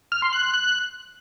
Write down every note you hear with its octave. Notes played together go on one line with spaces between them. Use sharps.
F6
C6
F#6
F#6
F#6